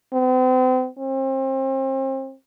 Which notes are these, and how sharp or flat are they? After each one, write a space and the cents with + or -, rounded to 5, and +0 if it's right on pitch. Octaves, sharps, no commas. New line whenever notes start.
C4 -40
C4 +35